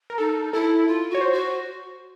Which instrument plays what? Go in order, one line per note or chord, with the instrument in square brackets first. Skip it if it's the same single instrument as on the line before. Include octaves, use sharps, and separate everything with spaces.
[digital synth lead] A#4
[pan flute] D#4 [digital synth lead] A4
[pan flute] E4 [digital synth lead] A4
[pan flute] F4
[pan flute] F#4 [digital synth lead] C#5
[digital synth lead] C5
[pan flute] F#4